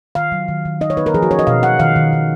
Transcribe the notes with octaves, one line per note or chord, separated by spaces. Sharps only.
D#3 F5
F#3
D#3
D#3
D#4 D#5
C#5
D#4 B4
A#4
F3 G#4
F#4
C#4 C#5
D#5
B2 F5
B2 F#5
D#3 F5
D#3
D#3